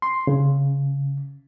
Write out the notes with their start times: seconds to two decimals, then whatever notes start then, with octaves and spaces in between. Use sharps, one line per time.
0.02 C6
0.27 C#3